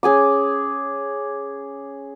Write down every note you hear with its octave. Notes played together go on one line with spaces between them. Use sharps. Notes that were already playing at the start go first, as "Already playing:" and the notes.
C#4 G#4 G#5 D6